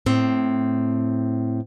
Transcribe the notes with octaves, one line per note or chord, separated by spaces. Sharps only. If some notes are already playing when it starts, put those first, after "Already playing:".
A2 C4